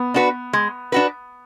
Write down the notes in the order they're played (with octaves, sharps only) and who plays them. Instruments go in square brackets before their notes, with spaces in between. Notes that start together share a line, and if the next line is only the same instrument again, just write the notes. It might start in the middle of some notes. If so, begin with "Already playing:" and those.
Already playing: [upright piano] B3
[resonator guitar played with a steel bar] D4 F#4 B4
G#3
D4 F#4 B4